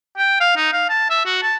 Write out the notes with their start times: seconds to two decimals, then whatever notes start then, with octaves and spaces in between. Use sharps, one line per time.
0.18 G5
0.40 F5
0.56 D#4
0.73 F5
0.90 A5
1.10 E5
1.26 F#4
1.42 A5